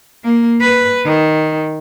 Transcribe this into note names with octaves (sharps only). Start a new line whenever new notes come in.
A#3
B4
D#3